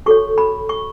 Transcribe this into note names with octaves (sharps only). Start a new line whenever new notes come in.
F#4 A4 C#5 C#6
B5
C#6